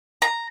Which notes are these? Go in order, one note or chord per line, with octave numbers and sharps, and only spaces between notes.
A#5